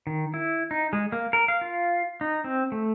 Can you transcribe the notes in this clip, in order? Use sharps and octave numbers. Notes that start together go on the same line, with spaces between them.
D#3
E4
D#4
G#3
A#3
A#4
F5
F4
D#4
C4
A3